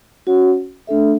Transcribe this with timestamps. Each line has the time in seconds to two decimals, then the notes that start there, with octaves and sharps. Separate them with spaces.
0.27 C#4 F#4 C#5 F#5
0.87 A3 D4 A4 E5